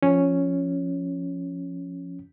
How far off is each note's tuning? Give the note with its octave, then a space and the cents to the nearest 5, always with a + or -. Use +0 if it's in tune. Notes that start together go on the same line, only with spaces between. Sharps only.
F3 +0 C#4 +0